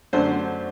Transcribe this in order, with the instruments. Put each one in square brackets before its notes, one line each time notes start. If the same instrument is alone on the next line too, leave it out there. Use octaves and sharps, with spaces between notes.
[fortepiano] F#2 D3 A3 D4 C5